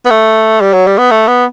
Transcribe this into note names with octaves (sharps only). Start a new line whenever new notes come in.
B3
A3
G3
F#3
G3
B3
A3
B3